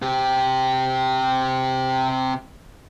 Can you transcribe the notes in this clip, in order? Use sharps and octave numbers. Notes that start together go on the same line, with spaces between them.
C3 G4